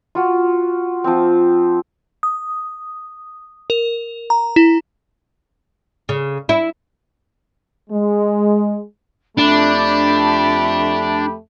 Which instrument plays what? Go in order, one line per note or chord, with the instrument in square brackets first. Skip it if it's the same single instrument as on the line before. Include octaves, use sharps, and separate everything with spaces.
[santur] F4 F#4
F3 C4
[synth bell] D#6
A#4
A#5
E4
[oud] C#3
E4
[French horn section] G#3
[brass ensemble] F2 A3 G4 [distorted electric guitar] D4 [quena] B5